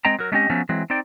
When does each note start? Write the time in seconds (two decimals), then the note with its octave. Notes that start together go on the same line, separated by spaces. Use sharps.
0.05 G#3 C4 D#5 G5 A#5
0.19 F#3 A#4
0.32 G#3 A3 C4 C#4 G4 D#5
0.50 F3 F#3 A3 B3 C#4
0.69 E3 F#3 G#3 C4
0.90 C4 D#4 D5 G5